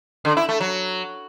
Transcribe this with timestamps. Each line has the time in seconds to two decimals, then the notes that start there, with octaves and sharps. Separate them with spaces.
0.25 D3
0.37 E4
0.49 A3
0.61 F#3